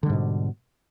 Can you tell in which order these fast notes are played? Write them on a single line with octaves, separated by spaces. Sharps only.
D3 G3 G#2 B2